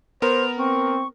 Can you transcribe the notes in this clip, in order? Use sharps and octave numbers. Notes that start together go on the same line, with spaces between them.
B3 A#4 C5 F7
C4 C#6